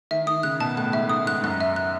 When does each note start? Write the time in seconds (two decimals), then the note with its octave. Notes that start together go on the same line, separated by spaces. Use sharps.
0.11 D#3 E5
0.27 D#3 D#6
0.43 C#3 F#6
0.60 B2 A5
0.77 A2 F#6
0.93 G#2 E5
1.09 G#2 D#6
1.27 G#2 F#6
1.43 F#2 F#6
1.60 E5
1.76 F#6